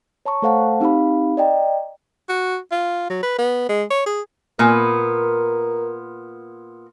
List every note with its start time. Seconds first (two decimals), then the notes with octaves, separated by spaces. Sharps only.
0.26 C#5 A5 A#5 C#6
0.42 A3 A4 C5 F5 F#5 A5
0.80 C4 D#4 G4 F5 B5
1.37 D5 D#5 G5 A#5
2.29 F#4
2.72 F4
3.10 F#3
3.23 B4
3.39 B3
3.69 G#3
3.91 C#5
4.06 G#4
4.59 A#2 B3 A#4 G#5